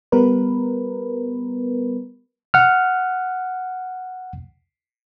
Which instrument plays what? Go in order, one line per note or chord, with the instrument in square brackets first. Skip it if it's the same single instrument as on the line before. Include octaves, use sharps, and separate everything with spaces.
[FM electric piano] G3 B3 A#4 B4
[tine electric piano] F#5 F6